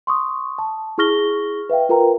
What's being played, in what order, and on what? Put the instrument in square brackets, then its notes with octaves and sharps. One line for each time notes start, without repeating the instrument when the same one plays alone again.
[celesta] C6 C#6 D#6
A5
E4 G#4 C#6 F6 A#6 G7
B4 E5 F5 G5
F4 A#4 B4 G5 A#5